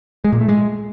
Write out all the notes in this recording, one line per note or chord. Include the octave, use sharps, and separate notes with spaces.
G#3
A#2
A3
G#3